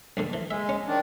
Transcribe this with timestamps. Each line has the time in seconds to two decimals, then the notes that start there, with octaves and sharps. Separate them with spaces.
0.17 A#1 G2 D3
0.33 E3
0.51 G#3 E5
0.69 C#4
0.88 D#3 D4